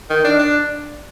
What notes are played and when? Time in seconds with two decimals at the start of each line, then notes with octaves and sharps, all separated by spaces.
0.10 D#3
0.25 D4
0.39 D4